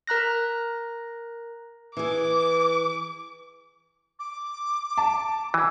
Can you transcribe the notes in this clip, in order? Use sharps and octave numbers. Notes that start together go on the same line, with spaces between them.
A#4 A#5 F#6 A#6
E3 G#4 D6
D6
A5
E3